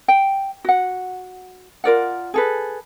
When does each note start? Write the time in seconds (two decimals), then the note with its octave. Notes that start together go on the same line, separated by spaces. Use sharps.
0.08 G5
0.65 F#4 F#5
1.84 F4 A#4 D5 F#5
2.34 G#4 A4 B4